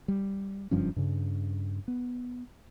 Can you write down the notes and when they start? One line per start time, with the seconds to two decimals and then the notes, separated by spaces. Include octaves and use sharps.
0.08 G3
0.71 F#1 G2 F3 C#4
0.96 G2 C#3
1.88 B3